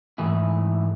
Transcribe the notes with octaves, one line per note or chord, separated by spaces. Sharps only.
G#2 E3 A3 E4 G#4